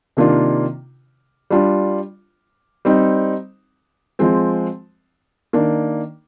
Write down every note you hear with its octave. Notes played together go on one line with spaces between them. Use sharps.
C3 D#3 A#3 D4 F4
G3 D4 F4
G3 C4 D#4
F3 G#3 C4
D#3 A#3 D4